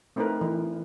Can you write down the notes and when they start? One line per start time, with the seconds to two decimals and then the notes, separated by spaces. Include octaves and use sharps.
0.16 A3 C4 D#4 E4 A#4 B4
0.41 E3